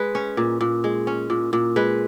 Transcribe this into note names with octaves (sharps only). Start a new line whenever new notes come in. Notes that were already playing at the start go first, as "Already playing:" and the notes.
Already playing: G#3 B4
C#4
A#2
A#2
G#3
C#4
A#2
A#2
G#3 B4